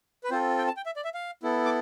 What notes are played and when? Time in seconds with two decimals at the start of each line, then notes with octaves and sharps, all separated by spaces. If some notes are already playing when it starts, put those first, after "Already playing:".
0.24 B4
0.30 C4 F4 A4 C5
0.58 G5
0.67 A5
0.77 G5
0.86 E5
0.96 D5
1.04 E5
1.14 F5
1.43 B3 E4 A4
1.65 D6